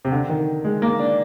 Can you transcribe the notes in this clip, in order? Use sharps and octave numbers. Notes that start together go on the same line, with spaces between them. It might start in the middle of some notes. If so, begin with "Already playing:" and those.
C3
D3
D#3
G#3
A#3
D4